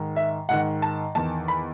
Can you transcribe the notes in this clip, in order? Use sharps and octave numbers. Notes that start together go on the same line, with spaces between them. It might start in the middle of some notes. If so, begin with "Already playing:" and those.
Already playing: G#2 D#3
E5
G#2 D#3 F#5
A5
E2 D#3 A5
B5